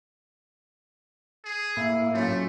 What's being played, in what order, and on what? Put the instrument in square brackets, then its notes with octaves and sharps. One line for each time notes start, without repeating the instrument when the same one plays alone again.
[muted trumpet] G#4
[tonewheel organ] A2 A#3 [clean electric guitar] E4
[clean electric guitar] F#3 C#4 F4 [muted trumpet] A3